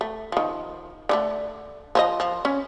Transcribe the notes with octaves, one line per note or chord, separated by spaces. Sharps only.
A3
D#3 F3
D3 F3 A3
F3 C5 D#5
F3
C#4